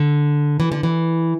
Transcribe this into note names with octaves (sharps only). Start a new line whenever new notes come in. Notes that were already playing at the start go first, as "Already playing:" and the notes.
Already playing: D3
E3
D3
E3